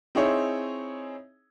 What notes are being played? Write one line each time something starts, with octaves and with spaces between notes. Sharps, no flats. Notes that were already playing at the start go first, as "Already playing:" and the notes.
C4 D#4 E4 G#4 C#5